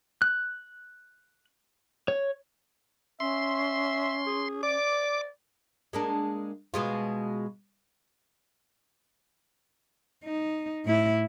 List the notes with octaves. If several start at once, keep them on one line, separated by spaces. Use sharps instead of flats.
F#6
C#5
C#4 E5 C6
G#4
D5 D6
G#3 A#3 D4
B2 G#3 F4
D#4
A2 E4